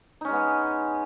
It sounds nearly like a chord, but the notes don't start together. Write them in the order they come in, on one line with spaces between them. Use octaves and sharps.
D#4 C#4 G#3 B3